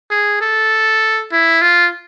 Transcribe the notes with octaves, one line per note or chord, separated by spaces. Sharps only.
G#4
A4
E4
F4